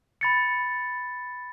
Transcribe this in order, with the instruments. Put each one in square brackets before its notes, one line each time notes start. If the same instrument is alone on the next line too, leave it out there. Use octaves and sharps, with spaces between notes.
[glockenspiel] B5 A6 C#7